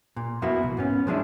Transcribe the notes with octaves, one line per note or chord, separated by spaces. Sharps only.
A#2
F2 A#3 B3 E4 F#4
C2
G#2 B3 C#4
F3 G#3 C#4 D4 E4